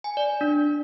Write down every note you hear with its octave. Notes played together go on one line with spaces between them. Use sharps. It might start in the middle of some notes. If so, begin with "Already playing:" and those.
G#5
D5
D4